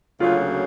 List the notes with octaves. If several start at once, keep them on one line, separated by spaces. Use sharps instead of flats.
D2 C#3 F#3 A#3 C#4 F4